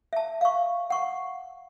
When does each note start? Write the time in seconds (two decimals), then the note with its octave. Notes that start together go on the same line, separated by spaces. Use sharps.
0.13 E5 A5
0.41 F5 C#6
0.90 F#5 C#6